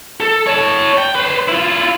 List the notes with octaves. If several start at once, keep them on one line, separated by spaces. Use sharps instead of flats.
A4
C#5 A5
G5
B4 C5
E4 F4